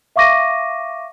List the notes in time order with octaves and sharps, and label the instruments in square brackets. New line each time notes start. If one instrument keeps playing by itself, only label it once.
[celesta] E5 F5 C#6 D6 A#6 D#7